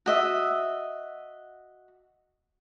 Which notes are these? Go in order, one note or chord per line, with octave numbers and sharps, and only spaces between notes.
F#4 D#5 E5